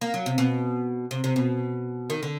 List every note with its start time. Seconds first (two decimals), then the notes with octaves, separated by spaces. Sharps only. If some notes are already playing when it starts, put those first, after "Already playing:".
0.01 A#3
0.14 F#3
0.26 C3
0.38 B2
1.11 C3
1.24 C3
1.36 B2
2.10 D#3
2.23 D3